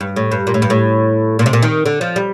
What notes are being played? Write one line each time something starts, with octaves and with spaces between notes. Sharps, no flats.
G2
A2
G2
A#2
A2
G2
A2
A#2
C3
A#2
D#3
D3
F3
G3